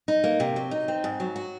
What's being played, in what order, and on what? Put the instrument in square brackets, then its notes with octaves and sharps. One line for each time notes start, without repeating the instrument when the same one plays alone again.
[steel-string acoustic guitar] D#4
A#3
C3
F#3
D#4
C4
G#2
F#3
F#4